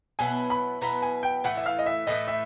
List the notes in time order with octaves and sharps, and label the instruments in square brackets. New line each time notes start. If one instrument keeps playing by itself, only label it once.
[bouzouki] B2 F#3 B3 E4 [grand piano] G#5
[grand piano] B5
[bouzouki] B2 F#3 B3 E4 [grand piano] A#5
[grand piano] G#5
G5
[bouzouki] A2 E3 A3 [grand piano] F#5
[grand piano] E5
F5
D#5
E5
[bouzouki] A2 E3 A3 [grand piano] D#5
[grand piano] E5